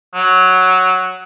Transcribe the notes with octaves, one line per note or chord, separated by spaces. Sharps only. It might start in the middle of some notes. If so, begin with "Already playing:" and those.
F#3